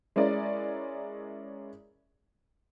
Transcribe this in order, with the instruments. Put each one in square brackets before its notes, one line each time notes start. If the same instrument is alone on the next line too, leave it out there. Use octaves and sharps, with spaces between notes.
[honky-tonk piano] G#3 C#4 E4 A#4 D5